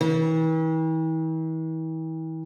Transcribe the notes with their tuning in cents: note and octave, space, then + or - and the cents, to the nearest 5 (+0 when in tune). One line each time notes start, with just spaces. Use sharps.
E3 -45